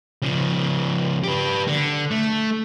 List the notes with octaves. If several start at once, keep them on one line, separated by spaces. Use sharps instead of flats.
C#3 F3
G4 B4
D3
A3